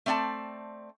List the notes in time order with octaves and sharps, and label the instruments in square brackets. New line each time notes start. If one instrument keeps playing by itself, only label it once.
[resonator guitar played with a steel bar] A3 C4 D5 F5 A5